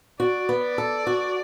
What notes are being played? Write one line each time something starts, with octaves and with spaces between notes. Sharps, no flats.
F#4 D5
B3
D5
A4
F#4